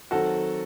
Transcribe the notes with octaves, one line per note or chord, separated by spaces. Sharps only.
D#3 F#3 C4 F#4 A4